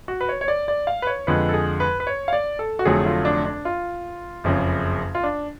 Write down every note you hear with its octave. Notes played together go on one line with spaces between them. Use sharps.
F#4
B4
C#5
C#5
D5
D5
F5
B4
C#5
F2 D3 G#3 B4
A4
G#4
B4
B4
C#5
F5
D5
A4
F#4
F1 F2 D3 F#3 A3 G#4
F4
D4
D4
F4
F#1 F2 C#3
F4
D4